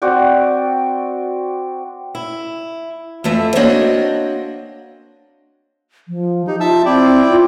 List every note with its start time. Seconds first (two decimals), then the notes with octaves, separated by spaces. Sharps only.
0.02 C4 F#4 D5 G5
2.15 E4
3.24 F2 E3 A3 E5
3.55 A#3 C4 D4 F#4 C#5 D#5
6.08 F3
6.47 D#4 G4
6.60 F4 E5 A5 E6
6.85 C4 E4 D5 G5
7.28 F4